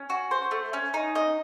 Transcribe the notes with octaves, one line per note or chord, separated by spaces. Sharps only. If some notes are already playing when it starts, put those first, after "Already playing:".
Already playing: C#4
F#4
C5
A3
C#4
D#4
D#5